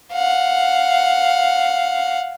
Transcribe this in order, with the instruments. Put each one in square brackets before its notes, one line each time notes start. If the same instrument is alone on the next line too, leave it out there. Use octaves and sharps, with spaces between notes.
[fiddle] F5 F#5